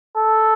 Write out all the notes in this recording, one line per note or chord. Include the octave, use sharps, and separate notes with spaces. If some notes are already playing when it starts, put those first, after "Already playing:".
A4